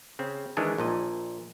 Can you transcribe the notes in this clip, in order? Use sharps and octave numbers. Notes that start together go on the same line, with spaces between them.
C#3 C4
D#3 E3 G#3 D4 G#4
A#1 A#2 D#5